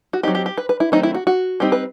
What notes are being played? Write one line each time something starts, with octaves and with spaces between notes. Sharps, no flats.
F#4
F#3 C4 D#4 G4
G4
G4
B4
B4
E4
D#3 F#3 A3 C4 D#4
E4
F#4
F#4
G3 C4 D#4 G4
B4